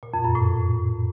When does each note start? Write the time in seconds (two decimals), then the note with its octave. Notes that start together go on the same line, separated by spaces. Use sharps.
0.03 A#2
0.14 F2
0.24 F#2
0.35 A2